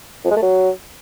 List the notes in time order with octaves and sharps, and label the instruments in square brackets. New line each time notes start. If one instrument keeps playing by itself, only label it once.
[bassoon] F2
G#3
A3
F#3